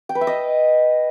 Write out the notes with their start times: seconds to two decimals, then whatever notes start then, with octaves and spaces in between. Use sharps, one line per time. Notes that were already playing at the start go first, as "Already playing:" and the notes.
0.09 G5
0.15 B4
0.21 E5
0.27 D#5